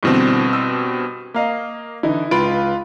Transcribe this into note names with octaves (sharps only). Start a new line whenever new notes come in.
G2 B2 D3 E3 C4
E6
A#3 D#5 F5 A#5
D3 E3 D#4 E4
C#2 F4 B4 B5 D7